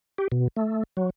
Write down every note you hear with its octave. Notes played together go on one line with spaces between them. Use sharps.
G4
B2
A3
F#3